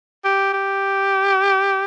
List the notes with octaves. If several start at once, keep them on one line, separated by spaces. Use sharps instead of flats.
G4
G4